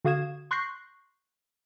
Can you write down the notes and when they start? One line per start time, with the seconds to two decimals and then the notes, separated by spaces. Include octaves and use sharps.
0.05 D3 F#4 F5 D#6 G#6 E7
0.51 C6 C#6 F#6 G6 A#6 C7